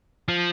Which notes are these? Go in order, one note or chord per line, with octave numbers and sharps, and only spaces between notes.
F3